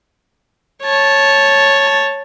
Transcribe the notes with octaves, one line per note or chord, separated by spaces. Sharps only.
C#5 A5